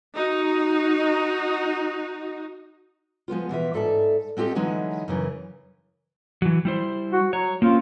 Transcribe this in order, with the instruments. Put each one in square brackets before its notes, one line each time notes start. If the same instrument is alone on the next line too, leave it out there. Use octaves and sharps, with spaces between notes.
[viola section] D#4 F#4
[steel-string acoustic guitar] F3 G#3 B3 F4
B2 E3 F4 E5
G#2 A4 D5 E5 A5
G#3 C4 F4 G4 A4
D3 E3 F#3 G#3 D#4 E4
F#2 C#3 E3 A#4
[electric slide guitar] E3 F#3
G3 E4 C5
[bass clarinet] F#4
[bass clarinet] F#3 [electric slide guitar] C#5
[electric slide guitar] A#3 C4 C#4 [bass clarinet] F4